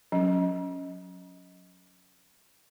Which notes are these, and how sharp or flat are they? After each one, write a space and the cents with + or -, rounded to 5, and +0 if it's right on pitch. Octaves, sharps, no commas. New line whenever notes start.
F#3 -25 C#4 +0